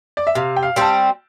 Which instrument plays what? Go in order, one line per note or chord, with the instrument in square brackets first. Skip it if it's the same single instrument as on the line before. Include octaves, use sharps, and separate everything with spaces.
[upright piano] D5
E5
[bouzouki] C3 [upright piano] F5
[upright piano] G5
F5
[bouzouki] G3 C4 [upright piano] A5